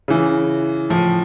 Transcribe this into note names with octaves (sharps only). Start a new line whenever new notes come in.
C#3 E3
A2 F3